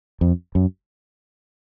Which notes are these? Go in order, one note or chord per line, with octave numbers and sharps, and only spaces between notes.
F2
F#2